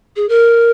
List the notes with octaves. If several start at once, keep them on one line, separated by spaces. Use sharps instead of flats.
G#4
A#4